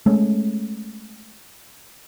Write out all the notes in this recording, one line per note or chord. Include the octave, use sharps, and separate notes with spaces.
G#3 A3 C#4